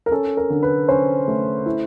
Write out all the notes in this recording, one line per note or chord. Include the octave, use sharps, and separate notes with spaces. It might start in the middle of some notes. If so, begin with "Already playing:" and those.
A#4
C#4 A4
A#4
D3
B4
C#4 C5
A3
E4